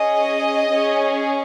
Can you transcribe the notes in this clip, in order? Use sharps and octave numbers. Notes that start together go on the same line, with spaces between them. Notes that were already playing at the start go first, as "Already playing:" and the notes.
Already playing: C#4 G#4 D#5
C#4 G#4